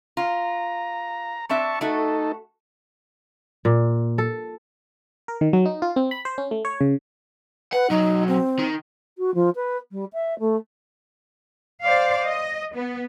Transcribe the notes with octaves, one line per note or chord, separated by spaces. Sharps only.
F4 A#5
C4 D4 E5 A5 C#6
A3 D#4 F#4 A4
A#2
A4
A#4
D#3
F#3
D#4
F4
C4
B5
C5
C#4
A3
C#5
C#3
B4 F#5
B1 F#3 D#4
C4
D#3
F#4
F3
B4
G3
E5
A3
C5 D5 F5
D#5
B3